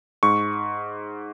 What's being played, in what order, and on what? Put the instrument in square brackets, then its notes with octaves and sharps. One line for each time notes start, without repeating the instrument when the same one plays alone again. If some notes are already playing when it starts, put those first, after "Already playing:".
[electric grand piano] G#2 C#6